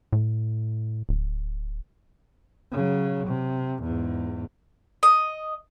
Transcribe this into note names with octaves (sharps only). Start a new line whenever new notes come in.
A2
D1
C#3 F#3
C3
E2 G#2
D#5